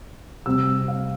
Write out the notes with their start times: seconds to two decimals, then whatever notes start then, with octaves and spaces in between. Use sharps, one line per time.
0.46 C3 G3 C4 E6
0.88 F5